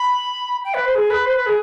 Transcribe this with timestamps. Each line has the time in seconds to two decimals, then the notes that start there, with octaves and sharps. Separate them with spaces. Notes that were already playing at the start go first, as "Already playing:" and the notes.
Already playing: B5
0.64 G5
0.74 B4
0.85 C5
0.95 G#4
1.10 B4
1.26 C5
1.35 B4
1.46 G#4